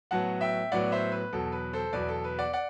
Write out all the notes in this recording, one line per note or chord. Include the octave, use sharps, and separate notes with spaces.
A2 F#3 B3 F#5 A5
E5 G5
A2 F#3 B3 D5 F#5
C5 E5
B4
E2 B2 F#3 A4
B4
A4 C5
E2 B2 F#3 B4 D5
A4
B4
D5 F#5
D5 F#5